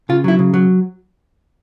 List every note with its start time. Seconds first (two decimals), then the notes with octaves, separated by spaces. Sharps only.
0.09 C#3 F4
0.24 F#3 E4
0.39 C#3
0.54 F#3